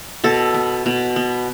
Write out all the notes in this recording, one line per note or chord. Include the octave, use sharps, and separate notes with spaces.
B2 A4
B3
B2
B3